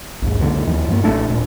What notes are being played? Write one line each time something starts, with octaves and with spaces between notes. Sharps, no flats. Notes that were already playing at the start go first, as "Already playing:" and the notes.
A#1 D#2 G#2
C#2 F#2 D3 A#3
D#2 F3
G2 A#3
A#1 A2 A3 D4
D#1 A#2 D4